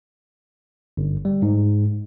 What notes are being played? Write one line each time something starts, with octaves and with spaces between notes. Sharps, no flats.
G1
G3
G#2